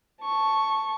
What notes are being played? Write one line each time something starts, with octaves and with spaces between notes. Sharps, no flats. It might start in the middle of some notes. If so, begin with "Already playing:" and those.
A5 C#6